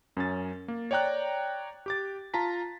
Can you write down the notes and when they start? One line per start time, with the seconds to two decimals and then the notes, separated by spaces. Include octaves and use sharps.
0.17 F#2 C#4 A6
0.68 A#3
0.91 C#5 D5 G5 A#5 F#6
1.86 G4 D6 A6
2.34 F4 A5 A#5 B6